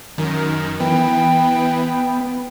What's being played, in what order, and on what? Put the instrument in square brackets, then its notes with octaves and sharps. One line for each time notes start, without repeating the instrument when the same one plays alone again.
[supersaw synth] F#2 D#3 [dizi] A#4
[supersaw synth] E3 [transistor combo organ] B3 [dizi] G5